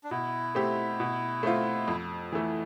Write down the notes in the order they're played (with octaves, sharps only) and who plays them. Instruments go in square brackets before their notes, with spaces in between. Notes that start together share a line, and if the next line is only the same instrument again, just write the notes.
[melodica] D4
[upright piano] B2 [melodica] E4
[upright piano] A3 C4 G4
B2
A3 C4 F4
F2
E3 A3